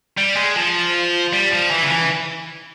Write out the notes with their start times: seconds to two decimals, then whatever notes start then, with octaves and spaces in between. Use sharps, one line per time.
0.17 G3
0.36 G#3
0.56 F3
1.33 G3
1.52 F3
1.71 E3
1.82 C#3
1.90 E3